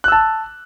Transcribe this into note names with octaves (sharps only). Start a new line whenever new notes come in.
A5 E6 F#6